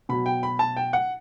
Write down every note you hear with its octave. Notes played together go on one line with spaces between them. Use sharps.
B2 F#3 B5
G5
B5
A5
G5
F#5